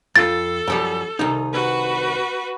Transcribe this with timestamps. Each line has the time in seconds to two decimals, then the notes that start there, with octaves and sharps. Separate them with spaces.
0.16 F2 F4 A4 A6
0.67 F#2 F3 G3
1.19 C2 D#3 D#4
1.53 F#4 B4